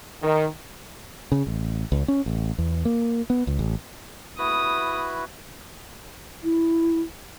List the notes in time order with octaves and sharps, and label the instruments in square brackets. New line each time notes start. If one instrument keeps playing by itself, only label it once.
[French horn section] D#3
[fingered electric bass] C#3
A1
C#2
C#4
A1
E2
A#3
B3
C#2
A1
[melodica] E4 F#4 B4 [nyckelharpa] D#6
[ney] E4